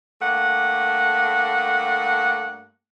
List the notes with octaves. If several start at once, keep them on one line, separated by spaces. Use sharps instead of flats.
G2 A3 A#3 F#5